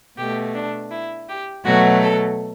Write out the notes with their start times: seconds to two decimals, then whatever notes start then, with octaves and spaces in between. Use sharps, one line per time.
0.17 B2 A3 G4
0.54 D4
0.90 E4
1.28 G4
1.64 B2 F#3 A3 F#4
2.02 A4